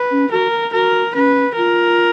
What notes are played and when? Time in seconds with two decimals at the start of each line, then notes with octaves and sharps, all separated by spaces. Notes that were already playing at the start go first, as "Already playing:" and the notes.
Already playing: B4
0.11 C#4
0.31 F#4 A#4
0.73 F#4 A#4
1.15 C#4 B4
1.57 F4 A#4